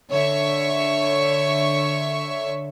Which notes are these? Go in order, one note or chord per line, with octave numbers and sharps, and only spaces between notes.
D3 C#5 E5 C#6